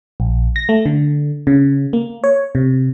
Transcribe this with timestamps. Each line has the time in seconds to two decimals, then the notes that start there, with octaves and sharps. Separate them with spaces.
0.20 A#1
0.56 A#6
0.69 A3
0.86 D3
1.47 C#3
1.93 A#3
2.24 C#5
2.55 C3